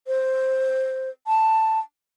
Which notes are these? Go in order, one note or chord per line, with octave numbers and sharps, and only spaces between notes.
C5
A5